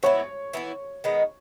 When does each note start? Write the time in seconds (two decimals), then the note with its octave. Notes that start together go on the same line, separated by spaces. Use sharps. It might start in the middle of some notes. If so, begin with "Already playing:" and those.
0.03 E3 B3 E4 C#5
0.53 E3 B3 E4
1.04 D#3 G#3 B3 D#4